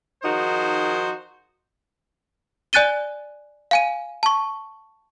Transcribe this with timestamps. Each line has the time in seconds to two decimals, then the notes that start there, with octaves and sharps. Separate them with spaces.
0.23 D#3 F3 D#4 F#4 G#4 C5
2.73 D5 G#5 F#6 A6 D#7 G7
3.71 F5 G#5 D#7
4.23 A5 C#6